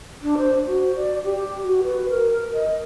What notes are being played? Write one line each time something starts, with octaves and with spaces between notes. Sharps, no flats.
D4
C5
F#4
D5
G4
F#4
B4
A#4
D#5